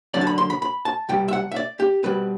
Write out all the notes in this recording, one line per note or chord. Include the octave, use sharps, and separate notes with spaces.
D2 D3 F#3 D4 D5
A5
B5
C6
B5
B5
A5
C2 B2 G3 G5
E5
F#5
E5
D5
G4
B2 G3 C4 B4